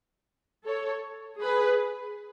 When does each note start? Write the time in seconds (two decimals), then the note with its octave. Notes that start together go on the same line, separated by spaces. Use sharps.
0.65 A4 C#5
1.41 G#4 B4